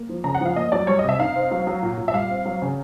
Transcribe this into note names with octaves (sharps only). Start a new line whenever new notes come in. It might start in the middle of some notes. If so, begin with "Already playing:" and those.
Already playing: A#3
F3
C#3 A#5
F#5
F3 F5
A#3 D#5
F#3 D5
G3 C#5
D#5
C3 E5
D#4 F5
C4
F#3
F#3
A#2
A#2
E5
G3 F5
C4
F#3
C#3